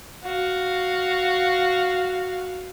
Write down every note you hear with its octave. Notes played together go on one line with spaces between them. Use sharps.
F#4 F5